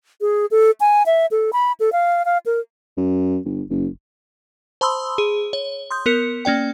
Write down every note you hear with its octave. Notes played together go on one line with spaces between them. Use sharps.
G#4
A4
G#5
E5
A4
B5
A4
F5
F5
A#4
F#2
G1
F#1
C5 A5 B5 C6 D#6 E6
G#4
C#5
C6 D#6 G6
B3 A#4 C#7
A#3 C#4 D5 G5